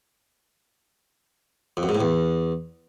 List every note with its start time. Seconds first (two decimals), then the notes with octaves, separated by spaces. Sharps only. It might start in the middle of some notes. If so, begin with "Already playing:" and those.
1.77 F2
1.83 F#2
1.89 G#2
1.95 A2
2.00 E2